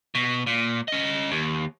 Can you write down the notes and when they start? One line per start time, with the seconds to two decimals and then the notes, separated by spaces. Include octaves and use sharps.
0.15 B2
0.47 A#2
0.88 C#4 D#5
1.31 D#2